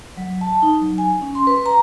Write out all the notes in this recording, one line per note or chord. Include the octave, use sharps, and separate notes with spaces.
F#3
A5
D#4
F#3
G#5
C#4
C6
B4
A#5